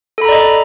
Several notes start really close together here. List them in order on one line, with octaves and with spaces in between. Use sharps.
A4 B5 A#5 D5 D#5